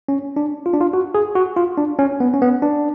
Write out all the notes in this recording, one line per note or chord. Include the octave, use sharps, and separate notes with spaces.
C#4
D4
F4
D4
F4
F#4
G#4
F#4
F4
D4
C#4
B3
C#4
B3
D4